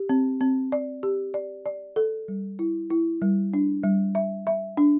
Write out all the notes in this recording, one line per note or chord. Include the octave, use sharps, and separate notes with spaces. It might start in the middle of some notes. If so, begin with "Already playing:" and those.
Already playing: G4
C4
C4
D5
G4
D5
D5
A4
G3
E4
E4
G3
D4
G3
E5
E5
D4